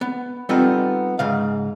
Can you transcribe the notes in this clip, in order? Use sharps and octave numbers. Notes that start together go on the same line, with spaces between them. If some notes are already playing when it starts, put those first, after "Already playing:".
B3
G3 B3 C4 D#4 F4 A4
G#2 C#3 F5